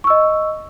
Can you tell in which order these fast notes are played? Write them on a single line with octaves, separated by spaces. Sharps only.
C#6 E6 D#5